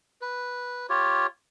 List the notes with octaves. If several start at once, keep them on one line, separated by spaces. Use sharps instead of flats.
B4
F4 G4 C#5